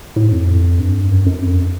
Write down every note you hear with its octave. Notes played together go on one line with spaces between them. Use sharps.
A2
F2
G2
F#2
F#2
F2